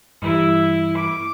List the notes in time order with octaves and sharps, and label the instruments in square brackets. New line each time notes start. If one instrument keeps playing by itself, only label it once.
[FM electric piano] G2 E3 G3 [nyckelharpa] E4
[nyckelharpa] D6